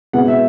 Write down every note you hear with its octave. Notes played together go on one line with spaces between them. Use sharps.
B2 G#3 B3 E4 F#5
E5